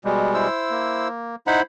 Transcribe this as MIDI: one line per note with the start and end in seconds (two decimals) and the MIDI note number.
0.05 0.48 47
0.05 0.48 55
0.05 0.48 56
0.34 1.08 64
0.34 1.08 72
0.34 1.08 88
0.70 1.36 58
1.47 1.60 63
1.47 1.62 64
1.47 1.62 72
1.47 1.60 78
1.47 1.62 83